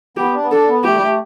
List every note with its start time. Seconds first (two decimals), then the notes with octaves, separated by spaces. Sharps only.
0.17 B3 G4
0.33 D4
0.42 B3
0.51 D4 A4
0.68 B3
0.84 A3 G4
0.94 G3
1.01 A3